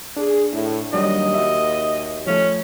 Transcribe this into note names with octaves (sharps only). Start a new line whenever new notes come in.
D4 G#4
A2
D#2 F#3 G3 D4 D#5
F#4 E5
F3 A3 C#4